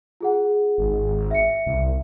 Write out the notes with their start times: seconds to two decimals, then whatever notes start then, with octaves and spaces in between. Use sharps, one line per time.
0.21 F4 G#4 F#5
0.78 G#1
1.31 E5 C#7
1.66 C2